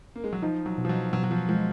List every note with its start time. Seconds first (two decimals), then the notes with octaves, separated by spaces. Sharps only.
0.15 A#3
0.24 G#3
0.33 F#3
0.42 F3 D#4
0.66 F#3
0.78 B2
0.85 F3
0.89 F#3
1.13 B2 F#3
1.24 F#3
1.31 F3
1.49 F3 G#3